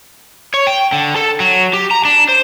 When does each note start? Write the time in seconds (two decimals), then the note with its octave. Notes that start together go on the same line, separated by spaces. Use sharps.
0.54 C#5
0.67 G5
0.92 D3
1.16 A4
1.40 F#3
1.73 G4
1.91 A#5
2.05 D4
2.29 C5